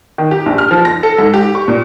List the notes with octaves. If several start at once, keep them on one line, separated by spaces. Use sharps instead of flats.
D#3
G4
A#1
F6
F3
A#6
A4
G#2
G4
C#6
A#2